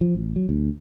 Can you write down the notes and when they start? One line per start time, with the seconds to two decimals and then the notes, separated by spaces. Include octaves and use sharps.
0.01 F3
0.15 A1
0.36 F#3
0.49 D2